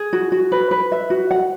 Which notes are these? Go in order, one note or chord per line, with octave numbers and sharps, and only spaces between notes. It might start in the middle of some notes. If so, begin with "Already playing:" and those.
Already playing: G#4
F#4
F#4
B4
B4
E5
F#4
F#5